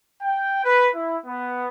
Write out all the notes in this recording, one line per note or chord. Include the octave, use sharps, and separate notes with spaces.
G5
B4
E4
B3